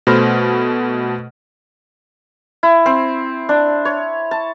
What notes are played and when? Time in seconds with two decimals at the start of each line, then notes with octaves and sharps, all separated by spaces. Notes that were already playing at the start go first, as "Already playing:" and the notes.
0.07 B2 A3 C5 B5 F6 A#6
2.63 E4
2.86 C4
3.49 D4
3.85 C#5
4.31 A5